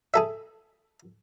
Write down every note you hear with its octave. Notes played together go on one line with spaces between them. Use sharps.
G#4 A4 E5